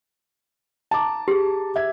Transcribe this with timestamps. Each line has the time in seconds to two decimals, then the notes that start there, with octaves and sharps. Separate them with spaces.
0.91 A5 A#5 D6
1.28 G4 G#4
1.76 E5 G#6